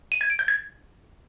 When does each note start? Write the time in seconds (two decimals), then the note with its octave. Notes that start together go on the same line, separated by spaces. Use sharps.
0.12 D#7
0.21 G#6
0.30 D7
0.39 G6
0.48 G#6